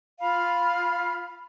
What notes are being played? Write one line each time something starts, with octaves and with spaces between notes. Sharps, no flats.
F4 F5 B5 F6